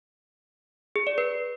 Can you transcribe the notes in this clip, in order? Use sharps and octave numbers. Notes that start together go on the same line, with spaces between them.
G#4
D5
B4